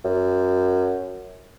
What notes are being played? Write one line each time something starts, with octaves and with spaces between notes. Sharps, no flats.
F#2